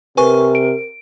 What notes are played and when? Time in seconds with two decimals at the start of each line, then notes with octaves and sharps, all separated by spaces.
0.17 C3 A#4 B4 G#5 C#6
0.55 D7